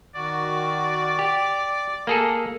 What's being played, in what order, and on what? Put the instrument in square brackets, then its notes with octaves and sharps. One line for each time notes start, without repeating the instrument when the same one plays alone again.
[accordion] D#3 F#4 [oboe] D5
[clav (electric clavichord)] G4 [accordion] D6
[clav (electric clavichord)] A#3 G#4 A4